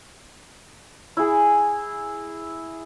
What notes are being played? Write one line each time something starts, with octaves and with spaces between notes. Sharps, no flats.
E4 G#4